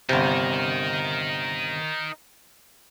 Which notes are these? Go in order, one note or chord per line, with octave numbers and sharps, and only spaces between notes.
G1 C3 D#4 A#4